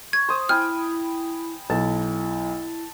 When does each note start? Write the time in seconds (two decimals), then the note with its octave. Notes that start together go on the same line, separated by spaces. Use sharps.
0.13 C#6 G#6
0.29 C5 D#6
0.49 E4 G5 G#5 B5 F6
1.70 B1 E4 A5